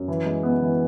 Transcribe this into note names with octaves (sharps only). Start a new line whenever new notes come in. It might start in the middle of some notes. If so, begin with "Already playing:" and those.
Already playing: F#2
E3
G#3
B3
E3